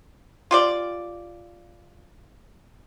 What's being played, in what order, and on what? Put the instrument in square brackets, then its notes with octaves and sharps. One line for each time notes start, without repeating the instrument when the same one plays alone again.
[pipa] F4 G4 D5